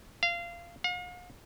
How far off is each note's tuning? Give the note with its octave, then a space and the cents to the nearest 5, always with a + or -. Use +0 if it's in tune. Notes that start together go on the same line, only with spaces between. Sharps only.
F5 -20
F5 +45